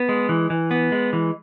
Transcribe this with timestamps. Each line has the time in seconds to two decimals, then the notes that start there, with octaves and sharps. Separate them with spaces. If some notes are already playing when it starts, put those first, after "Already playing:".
Already playing: B3
0.09 G#3
0.29 E3
0.50 E3
0.71 B3
0.92 G#3
1.13 E3